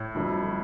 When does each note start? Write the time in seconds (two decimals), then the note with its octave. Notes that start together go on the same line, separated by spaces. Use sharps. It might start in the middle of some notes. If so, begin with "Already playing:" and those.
Already playing: A2
0.15 G1 F2 D3 F#3 A3